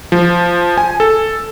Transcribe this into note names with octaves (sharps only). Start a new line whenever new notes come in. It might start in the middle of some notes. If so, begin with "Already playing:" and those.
F3
G#5
A4